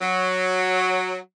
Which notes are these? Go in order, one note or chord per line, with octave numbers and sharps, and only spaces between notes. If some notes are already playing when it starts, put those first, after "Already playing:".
F#3